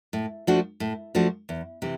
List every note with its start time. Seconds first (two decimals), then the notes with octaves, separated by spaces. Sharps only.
0.13 A2
0.47 F3 A3 D4 F#4
0.80 A2
1.15 F3 A3 D4 F#4
1.49 E2
1.82 C3 E3